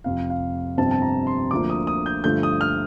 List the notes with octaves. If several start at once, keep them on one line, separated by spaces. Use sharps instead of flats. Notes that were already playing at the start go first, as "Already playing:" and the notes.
F1 F2 C3 F5
F5
G1 F2 C3 G3 C4 A5
A5
A#5
C6
D2 D3 F3 A#3 D6
D#6
D#6
G6
G2 D3 F3 A3 G6
D#6
F6